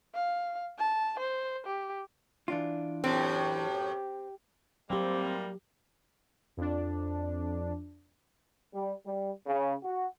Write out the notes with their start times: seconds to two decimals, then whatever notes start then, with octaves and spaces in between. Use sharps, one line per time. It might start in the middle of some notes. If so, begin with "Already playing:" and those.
0.14 F5
0.78 A5
1.19 C5
1.67 G4
2.48 E3 D4 F4
3.04 F#2 A2 C4 G4
4.90 A2 F#3 G3 A#3 C4 G4
6.57 F2 D4
8.74 G3
9.05 G3
9.46 C#3
9.83 F#4